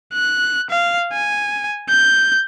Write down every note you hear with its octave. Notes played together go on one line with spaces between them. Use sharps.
F#6
F5
G#5
G6